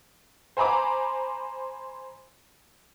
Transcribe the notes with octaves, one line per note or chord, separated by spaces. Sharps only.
C5 G#5 A#5 B5 D6